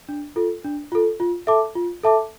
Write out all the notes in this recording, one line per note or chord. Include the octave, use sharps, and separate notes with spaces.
D4
F4 A4
D4
F4 A4
F4
A4 E5 A5 D6
F4
A4 E5 A5 D6